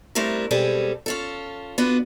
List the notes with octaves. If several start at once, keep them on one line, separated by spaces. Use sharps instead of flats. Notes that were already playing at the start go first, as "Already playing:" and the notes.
G3 A3 C4 D4 E4 A#4
B2 G3 G#3 C4 G#4 A4
C#4 F4 A4
B3 D4 F4 F#4